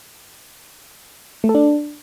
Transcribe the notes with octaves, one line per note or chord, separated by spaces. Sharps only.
A3
A4
D4